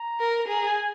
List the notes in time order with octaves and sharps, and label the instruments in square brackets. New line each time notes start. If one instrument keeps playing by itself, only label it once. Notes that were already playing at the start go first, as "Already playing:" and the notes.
Already playing: [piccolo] A#5
[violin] A#4
[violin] G#4 [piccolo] A#5
[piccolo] G#5